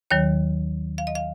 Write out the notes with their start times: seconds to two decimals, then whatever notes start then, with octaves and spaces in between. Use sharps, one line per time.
0.11 D#2 D#3 F#3 C#5
0.98 F5
1.07 D#5
1.15 F5